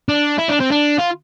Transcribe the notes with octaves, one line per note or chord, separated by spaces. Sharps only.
D4
E4
D4
C4
D4
F4